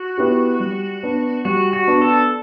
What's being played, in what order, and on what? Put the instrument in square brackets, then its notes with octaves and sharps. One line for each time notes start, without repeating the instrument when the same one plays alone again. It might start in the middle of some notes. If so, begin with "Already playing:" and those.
Already playing: [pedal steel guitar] F#4
[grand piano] B3 E4 G4
G3
B3 D4
[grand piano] G3 [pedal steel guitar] F#4
[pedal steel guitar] F#4
[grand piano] B3 D4
[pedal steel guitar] A4